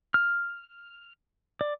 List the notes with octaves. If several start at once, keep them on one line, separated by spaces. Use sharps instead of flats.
F6
D5